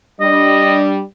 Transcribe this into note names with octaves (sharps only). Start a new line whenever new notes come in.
G3 D4 D#5